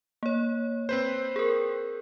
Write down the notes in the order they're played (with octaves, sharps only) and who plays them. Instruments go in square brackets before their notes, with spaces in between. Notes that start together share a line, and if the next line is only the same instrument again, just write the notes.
[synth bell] A#3 C#5
[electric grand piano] C4 B4 C5
[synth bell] G#4 A#4